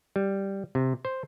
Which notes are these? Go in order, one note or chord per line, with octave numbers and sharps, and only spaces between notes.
G3
C3
C5